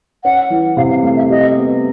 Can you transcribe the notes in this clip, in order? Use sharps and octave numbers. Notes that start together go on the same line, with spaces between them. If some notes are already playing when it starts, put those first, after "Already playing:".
C#4 F#5
E3
C3 F5
F5
A3 F5
E5
G4 D#5
B3